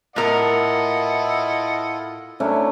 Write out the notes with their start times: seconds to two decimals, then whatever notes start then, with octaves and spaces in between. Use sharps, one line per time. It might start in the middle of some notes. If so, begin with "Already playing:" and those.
0.16 A2 E4 F4 A4 A#4 D#5 F#5
2.40 F#3 A3 C#4 D4 E4